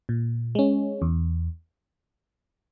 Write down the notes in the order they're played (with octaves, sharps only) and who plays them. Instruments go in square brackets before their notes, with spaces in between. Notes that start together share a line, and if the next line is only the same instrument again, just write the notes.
[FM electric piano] A#2
G#3 C#4
E2